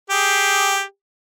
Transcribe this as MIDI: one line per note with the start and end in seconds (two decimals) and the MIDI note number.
0.10 0.83 67
0.10 0.83 68